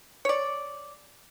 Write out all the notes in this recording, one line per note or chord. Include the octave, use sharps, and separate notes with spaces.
C#5 D5